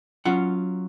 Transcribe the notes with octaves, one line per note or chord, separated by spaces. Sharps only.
F#3 C#4 F4 F#5